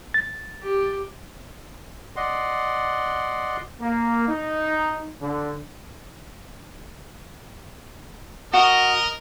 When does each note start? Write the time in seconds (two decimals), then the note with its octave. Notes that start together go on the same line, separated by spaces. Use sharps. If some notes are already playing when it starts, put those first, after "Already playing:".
0.14 A6
0.62 G4
2.16 D5 D#5 F#5 C6
3.80 A#3
4.28 D#4
5.21 D3
8.53 F#4 A#4 D#5